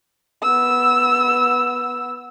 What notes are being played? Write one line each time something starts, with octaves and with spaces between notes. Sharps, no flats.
B3 E6